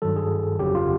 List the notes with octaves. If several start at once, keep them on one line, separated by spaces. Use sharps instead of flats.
G2 D#3 F#3 A4
G#4
G1 F2 C#3 F#3 G4
F4